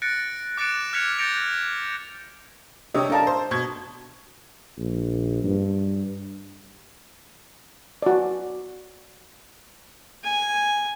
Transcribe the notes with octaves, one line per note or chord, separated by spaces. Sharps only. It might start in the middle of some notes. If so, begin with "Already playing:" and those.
F#6 A6 A#6 C#7 D7
D6 F#6 A6 C#7 D7 E7
F6 F#6 G#6 B6 C#7 F7
G6 A6 A#6 C#7 D7 F7
C3 D4 G4 C#5 D#5
D4 A4 A#4 F5 A5
C5
B2 C#6 G#6
A#1
G2
F#4 D5
G#5